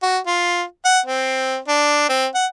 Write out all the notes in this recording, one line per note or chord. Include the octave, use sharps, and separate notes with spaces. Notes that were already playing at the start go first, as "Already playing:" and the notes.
F#4
F4
F#5
C4
D4
C4
F#5